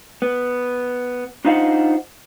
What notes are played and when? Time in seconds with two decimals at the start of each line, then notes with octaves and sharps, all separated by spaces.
0.22 B3
1.45 D4 D#4 F4 C5 D#5 F#5